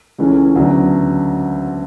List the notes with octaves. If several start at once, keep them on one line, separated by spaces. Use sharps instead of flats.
C#2 C#3 E3 A3 C#4
D2 C#3 F#3 B3 D4